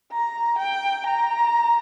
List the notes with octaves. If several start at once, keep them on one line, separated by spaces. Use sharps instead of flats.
A#5
G5
A#5